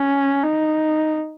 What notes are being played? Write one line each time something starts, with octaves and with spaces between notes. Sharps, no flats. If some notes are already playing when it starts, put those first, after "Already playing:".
Already playing: C#4
D#4